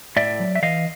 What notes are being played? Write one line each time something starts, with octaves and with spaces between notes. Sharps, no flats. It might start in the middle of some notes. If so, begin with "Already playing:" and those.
A2 D5 E5
F#3
E5
E3 D#5 F5